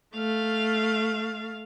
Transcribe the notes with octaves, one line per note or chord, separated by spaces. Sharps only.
A3 F5